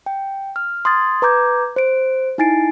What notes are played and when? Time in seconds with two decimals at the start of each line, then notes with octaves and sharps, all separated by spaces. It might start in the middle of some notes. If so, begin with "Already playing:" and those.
0.06 G5
0.56 F6
0.85 C6 D#6 G#6 A6
1.22 B4 A#5 D6 G6 G#6
1.76 C5 D7
2.38 D#4 E4 G#5 A6 C7 D7